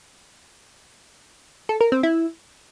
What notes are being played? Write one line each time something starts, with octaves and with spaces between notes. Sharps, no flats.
A4
A#4
C4
E4